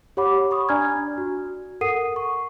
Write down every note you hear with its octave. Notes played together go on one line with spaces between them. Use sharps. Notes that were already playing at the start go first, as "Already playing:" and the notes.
G4 C#5 F#5 B5 D6
B5 C#6 D#6
D4 D5 G#5 A#5 F6 G#6
F#4
A4 A#4 F#5 D#6 C7 D#7
C#6